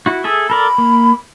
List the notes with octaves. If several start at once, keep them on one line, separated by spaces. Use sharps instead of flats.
E4 F#4
G#4 A4 E5
A4 A#4 D5 B5
A#3